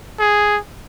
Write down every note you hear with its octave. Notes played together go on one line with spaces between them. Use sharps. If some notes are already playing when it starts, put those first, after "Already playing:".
G#4